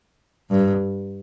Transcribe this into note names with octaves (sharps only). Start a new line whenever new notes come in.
G2